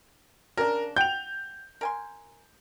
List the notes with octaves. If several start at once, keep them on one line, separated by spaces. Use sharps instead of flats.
C#3 D4 A#4
F#5 G5 G6 F7
A#4 G#5 C6